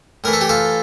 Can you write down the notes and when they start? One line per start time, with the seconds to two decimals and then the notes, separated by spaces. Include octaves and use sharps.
0.24 A2 E3 A3 A#4
0.33 A4
0.41 G4
0.49 F4 A4